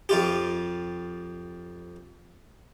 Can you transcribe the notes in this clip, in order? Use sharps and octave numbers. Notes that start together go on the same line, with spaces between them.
F2 F4 G4